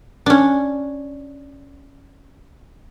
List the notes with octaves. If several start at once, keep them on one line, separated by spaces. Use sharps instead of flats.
C#4 D4